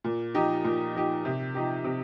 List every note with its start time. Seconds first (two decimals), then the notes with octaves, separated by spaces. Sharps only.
0.04 A#2
0.34 F3 D#4 G4
0.64 A#2
0.95 F3 D#4 G4
1.25 C3
1.54 F3 D#4 G4
1.84 C3